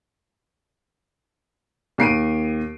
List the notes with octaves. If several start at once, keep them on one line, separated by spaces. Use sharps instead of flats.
D#2 C7 D7 D#7